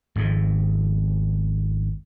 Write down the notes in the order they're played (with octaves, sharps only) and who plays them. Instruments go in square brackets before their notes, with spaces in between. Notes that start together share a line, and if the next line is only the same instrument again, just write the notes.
[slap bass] G#1 F2 G#2